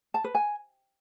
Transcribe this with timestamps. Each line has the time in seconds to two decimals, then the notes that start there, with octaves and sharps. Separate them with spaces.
0.14 A5
0.24 B4
0.35 G#5